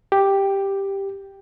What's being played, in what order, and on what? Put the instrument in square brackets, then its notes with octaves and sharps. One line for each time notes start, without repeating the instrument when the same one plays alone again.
[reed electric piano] G4